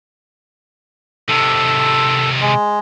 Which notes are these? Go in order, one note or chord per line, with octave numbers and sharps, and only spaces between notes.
C3 D#3 A4
G#3